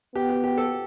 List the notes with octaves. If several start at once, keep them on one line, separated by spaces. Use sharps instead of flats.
B3 G4
G4
G4
A4